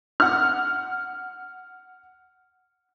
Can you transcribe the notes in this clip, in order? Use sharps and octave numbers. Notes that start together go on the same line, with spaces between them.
F#5 F6